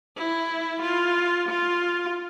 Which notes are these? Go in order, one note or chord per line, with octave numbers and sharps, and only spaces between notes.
E4
F4
F4